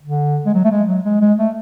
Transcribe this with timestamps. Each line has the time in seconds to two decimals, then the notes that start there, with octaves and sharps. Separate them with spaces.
0.03 D3
0.46 G#3
0.54 F#3
0.64 A3
0.71 G#3
0.88 F#3
1.05 G#3
1.21 G#3
1.38 A3